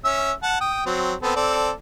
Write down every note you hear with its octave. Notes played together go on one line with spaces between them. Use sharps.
C#4 E5 E6
F#5 A5
G5 D#6
F#3 C4
B3 C4 A4
C4 A4 D5